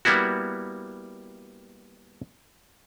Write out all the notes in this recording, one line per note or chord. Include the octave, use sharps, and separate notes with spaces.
G3 A#3 B3 E4 F#4